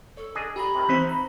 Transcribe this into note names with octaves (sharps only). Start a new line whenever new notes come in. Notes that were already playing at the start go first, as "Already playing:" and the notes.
A4 C#5
D4 G#4 D#5
G4 A#5 B5
C3 D#3
E3 C4 D#4 B4 C5 E5
A#5 B5